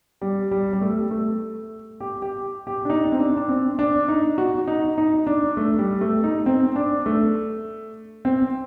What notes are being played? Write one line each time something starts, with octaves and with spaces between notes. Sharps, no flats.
G3
G3
G3
A3
A3
G4
G4
G4
D4
D#4
C4
D4
D4
C4
D4
D#4
F#4
D#4
D#4
D4
A3
G3
A3
D#4
C4
D4
A3
C4